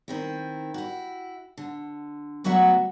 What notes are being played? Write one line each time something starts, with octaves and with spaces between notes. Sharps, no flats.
D#3 C4 E4
E4 F#4
D3
D2 F#3 B3 F#4 E5 F#5